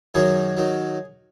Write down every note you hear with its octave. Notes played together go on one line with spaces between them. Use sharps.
F#2 D#3 F#3 G#4
D#3 F#3